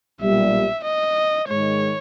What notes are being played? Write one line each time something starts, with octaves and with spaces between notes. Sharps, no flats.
B1 A#2 G3 E5
D#5
G#2 D#3 G#3 C#5